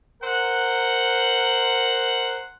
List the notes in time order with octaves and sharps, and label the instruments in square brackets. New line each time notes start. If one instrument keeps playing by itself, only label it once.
[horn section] A#4 C5 F#5